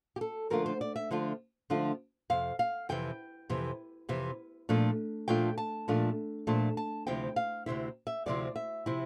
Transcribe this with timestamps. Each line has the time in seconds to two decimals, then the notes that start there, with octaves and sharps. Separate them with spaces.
0.16 G4
0.21 A4
0.50 D3 F3 A3 D4 F4 A#4
0.66 C5
0.81 D5
0.96 E5
1.11 D3 F3 A3 D4 F4
1.70 D3 F3 A3 D4 F4
2.30 F2 C3 F5
2.59 F5
2.89 F2 C3 E3 G5
3.50 F2 C3 E3
4.09 F2 C3 E3
4.69 A#2 F3 A3 D4 F4
5.28 A#2 F3 A3 D4 F4 G5
5.58 A5
5.88 A#2 F3 A3 D4 F4
6.47 A#2 F3 A3 D4 F4 A5
6.77 A5
7.07 D2 C3 F3 C4 E4 G5
7.36 F5
7.66 D2 C3 F3 C4 E4 E5
8.07 E5
8.26 D2 C3 F3 C4 E4 D5
8.56 E5
8.86 C3 F3 C4 E4